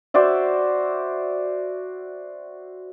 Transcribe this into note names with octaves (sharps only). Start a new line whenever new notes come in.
F#4 C5 D5 E5